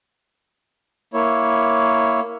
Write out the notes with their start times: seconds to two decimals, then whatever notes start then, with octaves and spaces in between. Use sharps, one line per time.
1.14 A#3 E4 C#5